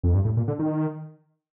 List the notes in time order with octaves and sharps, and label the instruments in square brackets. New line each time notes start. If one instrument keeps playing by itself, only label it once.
[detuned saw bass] F2
G2
A2
A#2
D3
D#3